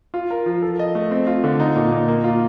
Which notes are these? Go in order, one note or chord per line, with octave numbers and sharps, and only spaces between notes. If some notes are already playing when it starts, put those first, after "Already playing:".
F4
A#4
F3
A4
D#5
A3
C4
F4
D3
D#4
A#2
A#2
A#3
F4